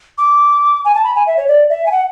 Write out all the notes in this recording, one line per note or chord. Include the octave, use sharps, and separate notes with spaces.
D6
G#5
A5
B5
G#5
E5
C#5
D5
E5
G#5
F#5